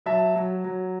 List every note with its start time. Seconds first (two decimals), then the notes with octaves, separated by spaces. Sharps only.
0.06 F#3 E5 A5
0.35 F#3
0.64 F#3